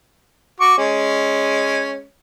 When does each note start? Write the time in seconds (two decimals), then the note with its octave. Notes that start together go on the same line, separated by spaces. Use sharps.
0.60 F#4 C#6 D6
0.78 G#3 C#4